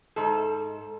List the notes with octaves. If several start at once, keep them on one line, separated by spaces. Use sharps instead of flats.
G#2 A4